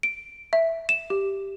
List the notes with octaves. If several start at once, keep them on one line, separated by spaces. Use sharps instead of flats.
D7
E5
E7
G4